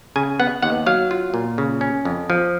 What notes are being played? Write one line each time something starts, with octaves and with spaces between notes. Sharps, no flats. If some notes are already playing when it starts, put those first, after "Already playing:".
C#3 G#5
B3 F#5
D#2 F#5
F#3 F5
F4
A#2
C#3
C#4
F2
F3